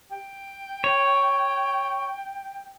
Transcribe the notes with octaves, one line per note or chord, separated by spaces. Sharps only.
G5
C#5